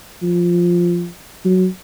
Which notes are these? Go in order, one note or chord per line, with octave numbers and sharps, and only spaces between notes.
F3
F#3